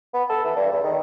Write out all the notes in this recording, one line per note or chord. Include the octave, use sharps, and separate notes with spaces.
B3
A4
E3
G2
E2
D#3